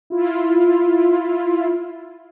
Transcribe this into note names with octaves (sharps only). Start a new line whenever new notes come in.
E4 F4